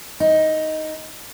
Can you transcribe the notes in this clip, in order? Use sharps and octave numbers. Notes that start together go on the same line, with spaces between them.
D#4